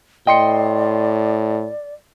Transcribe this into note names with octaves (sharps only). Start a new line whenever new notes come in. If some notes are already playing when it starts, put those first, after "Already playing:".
A2 D5 D#5 G5 C6 C#7